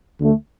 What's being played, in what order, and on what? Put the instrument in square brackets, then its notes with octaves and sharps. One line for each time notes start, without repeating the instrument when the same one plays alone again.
[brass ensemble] D2 D3 A3